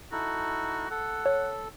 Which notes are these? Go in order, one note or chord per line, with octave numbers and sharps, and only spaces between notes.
D#4 E4 F#4 A4
A4 F#5
C#5